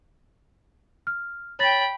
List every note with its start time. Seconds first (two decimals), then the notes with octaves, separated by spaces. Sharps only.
1.07 F6
1.59 C#5 G5 B5 A6